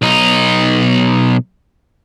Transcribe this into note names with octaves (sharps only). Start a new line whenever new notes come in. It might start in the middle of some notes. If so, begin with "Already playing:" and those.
B1 D#4